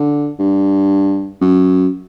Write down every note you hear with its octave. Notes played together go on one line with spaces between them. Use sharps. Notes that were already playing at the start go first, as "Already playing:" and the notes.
Already playing: D3
G2
F#2